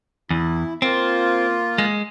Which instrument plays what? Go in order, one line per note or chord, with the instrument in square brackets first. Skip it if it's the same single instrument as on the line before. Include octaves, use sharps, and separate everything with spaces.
[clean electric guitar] E2 [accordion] E4
[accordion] A#3 F4 [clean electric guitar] C4
[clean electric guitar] G#3